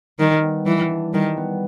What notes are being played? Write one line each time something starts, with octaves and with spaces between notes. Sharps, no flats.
D#3 G3
B3
E3 G3
D4
D#3 G3
B3